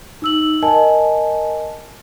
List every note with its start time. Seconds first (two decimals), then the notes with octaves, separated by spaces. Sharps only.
0.22 D#4 E6 F#7
0.62 A#4 D#5 G#5 A5